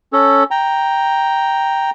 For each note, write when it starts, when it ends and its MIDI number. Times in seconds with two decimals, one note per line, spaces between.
0.13 0.44 61
0.13 0.44 69
0.51 1.90 79
0.51 1.90 82